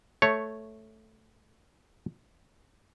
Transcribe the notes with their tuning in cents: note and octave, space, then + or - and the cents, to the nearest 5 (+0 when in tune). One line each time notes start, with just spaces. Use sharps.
A3 +0 C#5 +0